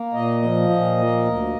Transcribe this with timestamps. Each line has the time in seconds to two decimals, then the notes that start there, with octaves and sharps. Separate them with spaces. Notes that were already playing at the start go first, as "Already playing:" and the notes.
Already playing: A#3
0.14 A#2 D#5
0.42 F3
0.69 A#2
0.98 A#3
1.25 D2